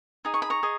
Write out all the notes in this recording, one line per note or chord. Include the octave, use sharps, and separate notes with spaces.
D#4 G#4
C#6
B5
A#5 C#6
G#4 D#5